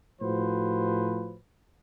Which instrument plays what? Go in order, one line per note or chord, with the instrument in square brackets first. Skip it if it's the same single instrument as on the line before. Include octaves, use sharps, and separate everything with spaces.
[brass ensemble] A2 F3 F#4 B4 C5